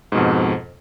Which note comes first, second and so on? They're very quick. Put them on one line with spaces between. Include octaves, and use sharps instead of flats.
G#2 B2 F2